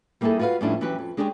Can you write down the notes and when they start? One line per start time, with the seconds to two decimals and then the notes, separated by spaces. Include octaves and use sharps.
0.21 G3 A#3 D#4 E4 G#4 A4
0.39 F4 F#4 B4 D5 F5
0.61 F2 A2 G3 C#4 D4 E4
0.81 E3 F#3 C#4 G4 B4
0.99 F2
1.17 G#3 D4 G4 G#4 C5 C#5